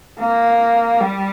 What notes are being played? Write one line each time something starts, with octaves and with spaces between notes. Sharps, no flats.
A#3
G3